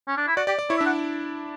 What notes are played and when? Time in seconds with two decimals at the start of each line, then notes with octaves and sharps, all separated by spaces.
0.08 C#4
0.17 D4
0.28 E4
0.37 F#4 D5
0.47 G4 D5
0.59 D5
0.70 E4 C#5
0.78 E5
0.81 D4
0.86 F#5